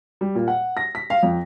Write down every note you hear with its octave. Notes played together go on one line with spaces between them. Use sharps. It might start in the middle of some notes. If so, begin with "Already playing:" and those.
G3
A#2
F#5
A#6
B6
F5
F2